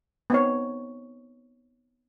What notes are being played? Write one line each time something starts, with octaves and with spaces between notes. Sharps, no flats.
B3 C4 D#4 C#5